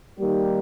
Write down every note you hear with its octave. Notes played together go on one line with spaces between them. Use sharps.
D#3 G3 A#3 D#4 G4